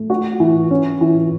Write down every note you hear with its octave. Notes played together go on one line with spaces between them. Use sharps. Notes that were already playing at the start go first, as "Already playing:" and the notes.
Already playing: A3
F#4
E3
C#4
E3